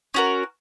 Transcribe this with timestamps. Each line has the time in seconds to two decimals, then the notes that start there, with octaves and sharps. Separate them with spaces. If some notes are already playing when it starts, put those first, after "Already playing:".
0.14 C#4 F#4 A#4